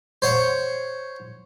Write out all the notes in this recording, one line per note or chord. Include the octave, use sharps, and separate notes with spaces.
C5 C#5 F#5